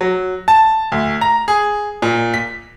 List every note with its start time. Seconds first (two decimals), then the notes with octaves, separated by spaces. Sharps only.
0.01 F#3
0.48 A5
0.92 D2
1.21 A#5
1.48 G#4
2.02 A#2
2.34 B6